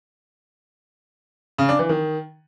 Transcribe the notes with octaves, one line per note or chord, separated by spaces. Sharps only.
C#3
D4
E3
D#3